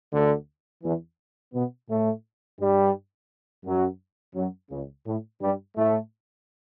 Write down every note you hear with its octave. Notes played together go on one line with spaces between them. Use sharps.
D2 D3
E2 E3
B2 B3
A2 A3
G2 G3
F#2 F#3
F#2 F#3
C#2 C#3
A2
G2 G3
A2 A3